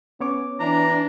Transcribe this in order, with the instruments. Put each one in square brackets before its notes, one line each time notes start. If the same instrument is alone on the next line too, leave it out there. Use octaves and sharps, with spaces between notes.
[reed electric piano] B3 C#5 D6 [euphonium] C#4
[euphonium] E3 [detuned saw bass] D4 [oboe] A#5